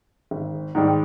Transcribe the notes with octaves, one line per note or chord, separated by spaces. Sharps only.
G#1
G#2 D#3 G3